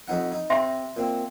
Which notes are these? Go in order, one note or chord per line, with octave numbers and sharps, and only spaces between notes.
F2 D#4 F#5
D#4
C3 E5 C6
A#2 C4